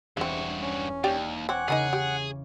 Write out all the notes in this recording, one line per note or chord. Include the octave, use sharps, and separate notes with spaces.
E1 G2 C#3 C4 F#4
C#4
D#2 G4 D5 G5
C4 C#5 F#5 G#5 D6
C#3 D#4 G#4 A#4 G#5
G4